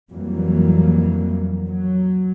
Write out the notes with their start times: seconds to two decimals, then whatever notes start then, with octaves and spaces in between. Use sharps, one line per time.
0.11 F2 E3 F#3 G3 A#3
1.65 F#3